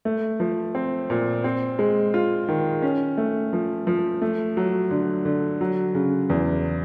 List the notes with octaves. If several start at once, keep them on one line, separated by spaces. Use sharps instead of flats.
A3
F3
C4
A#2
C4
G#3
F4
D#3
C#4
A3
F3
F3
A3
F#3
D3
D3
F#3
C#3
E2